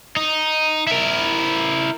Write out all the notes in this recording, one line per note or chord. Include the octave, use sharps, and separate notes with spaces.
D#4
E4 A#4